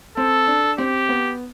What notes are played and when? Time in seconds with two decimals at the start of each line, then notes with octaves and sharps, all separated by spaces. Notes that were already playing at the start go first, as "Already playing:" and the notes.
0.17 C4 A4
0.47 D4
0.78 C4 G4
1.09 B3